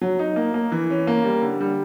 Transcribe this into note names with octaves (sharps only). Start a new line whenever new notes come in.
F#3
D#4
A#3
A#3
E3
C#4
A#3
G3
D3
G3